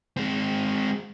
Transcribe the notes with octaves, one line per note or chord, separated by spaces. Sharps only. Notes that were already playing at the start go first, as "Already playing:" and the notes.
G#3 C4